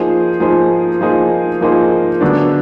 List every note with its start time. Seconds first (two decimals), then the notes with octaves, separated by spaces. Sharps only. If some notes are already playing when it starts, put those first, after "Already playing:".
Already playing: F3 A#3 D#4 G#4 C5
0.40 F3 A#3 D#4 G#4 C5
1.01 F3 A#3 D#4 G#4 C5
1.61 F3 A#3 D#4 G#4 C5
2.21 D3 F#3 B3 D4